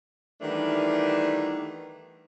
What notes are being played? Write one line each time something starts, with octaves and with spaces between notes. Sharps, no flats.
D#3 E3 G3 A3 B3 D4